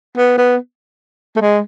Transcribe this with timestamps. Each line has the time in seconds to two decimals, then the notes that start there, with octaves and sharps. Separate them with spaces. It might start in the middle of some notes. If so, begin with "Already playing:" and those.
0.17 B3
0.38 B3
1.36 A3
1.41 G#3